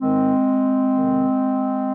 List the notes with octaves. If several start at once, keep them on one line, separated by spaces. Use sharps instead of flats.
G#2 D#3 G#3 C4
F2 C3 D#3